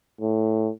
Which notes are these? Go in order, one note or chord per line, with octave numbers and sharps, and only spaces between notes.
A2